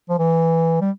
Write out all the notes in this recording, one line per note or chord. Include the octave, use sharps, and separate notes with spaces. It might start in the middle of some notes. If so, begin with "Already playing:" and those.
F3
E3
G3